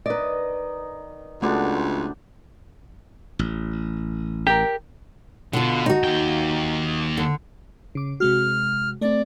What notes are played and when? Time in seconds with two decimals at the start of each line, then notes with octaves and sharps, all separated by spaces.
0.06 D#3 B4 D5 D#5
1.42 C#2 A3 B3 C4 D4 F#4 A4
3.39 A1
4.47 G4 A#4
5.53 B2 D3 F4
5.86 D#4 F#4
6.04 D#2 G5
7.17 D3
7.95 C#3 D6
8.20 C3 G#3 F#4 F6
9.01 A3 C4 D5